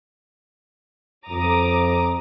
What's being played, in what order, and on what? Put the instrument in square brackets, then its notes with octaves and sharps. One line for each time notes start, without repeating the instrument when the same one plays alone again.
[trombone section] F2 [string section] A#5 D6 D#6